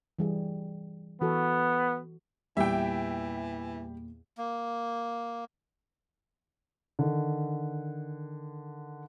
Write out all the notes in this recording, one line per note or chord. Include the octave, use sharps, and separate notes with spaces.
E3 G3 G#4
E3 B3 F#4 A4
E2 A#2 E3 G3 B3 E5 G5
A#3
D3 D#3